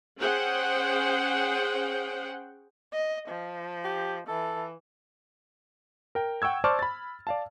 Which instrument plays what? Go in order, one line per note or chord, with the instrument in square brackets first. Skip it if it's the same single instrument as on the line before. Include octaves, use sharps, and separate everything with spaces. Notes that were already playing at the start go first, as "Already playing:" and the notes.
[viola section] C#4 G#4 C5 F#5 G5
[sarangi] D#5
F3
[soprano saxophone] G4
[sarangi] E3 [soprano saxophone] A4
[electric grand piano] A#4 G5
F#5 G5 C#6 E6 G#6
C5 D5 A5 C#6 D6 F6
B5 A6
D5 F5 A5